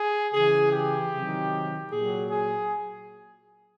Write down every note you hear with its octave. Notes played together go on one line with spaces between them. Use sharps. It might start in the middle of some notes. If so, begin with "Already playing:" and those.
Already playing: G#4
C#3 E3 G#4
G4
C3 D#3 F#3
A#2 F#3 G#4
G#4